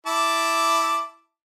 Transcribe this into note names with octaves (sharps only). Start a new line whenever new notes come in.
E4 A5 D6